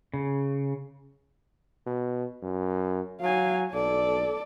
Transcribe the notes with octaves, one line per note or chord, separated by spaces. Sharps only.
C#3
B2
F#2
F#3 F5 G#5
B1 A4 D5